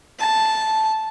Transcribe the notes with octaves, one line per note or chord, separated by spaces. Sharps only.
A5